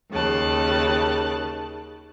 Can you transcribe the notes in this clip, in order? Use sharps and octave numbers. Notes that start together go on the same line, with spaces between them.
D#2 C#3 A5 F#6